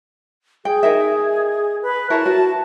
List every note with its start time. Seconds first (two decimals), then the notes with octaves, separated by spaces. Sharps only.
0.65 G#4 G5
0.83 D#4 A#4 E5
1.83 B4
2.10 E4 A#4 C#5 A5
2.26 F#4